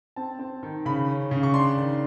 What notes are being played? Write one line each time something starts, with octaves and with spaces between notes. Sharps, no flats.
C4 A5
C4
D#3
C#3 B5
C#4
C#3
C#6
D4 C6
D#3